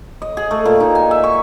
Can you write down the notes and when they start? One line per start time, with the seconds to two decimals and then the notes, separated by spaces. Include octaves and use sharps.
0.22 D#5
0.37 G#4
0.51 A3
0.65 A#2
0.80 D#4
0.95 G#5
1.11 E5
1.24 C#6